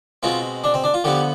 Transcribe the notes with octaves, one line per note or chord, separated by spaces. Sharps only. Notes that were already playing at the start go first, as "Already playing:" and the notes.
B2 G#3 C4 F4
D4
C4
D4
F4
D3 F3 B3 G4